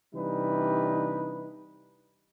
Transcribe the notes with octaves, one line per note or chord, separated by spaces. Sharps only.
C3 E3 G3 D4 D#4 B4